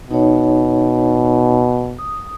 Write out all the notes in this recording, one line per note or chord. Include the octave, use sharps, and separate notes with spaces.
B2 D#4 C#5
D#6